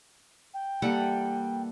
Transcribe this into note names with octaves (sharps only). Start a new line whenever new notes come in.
G5
E3 G3 A#3 A4 F#5